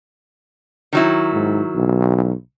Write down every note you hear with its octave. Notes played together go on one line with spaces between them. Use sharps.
D#3 F#3 E4
G#2
B1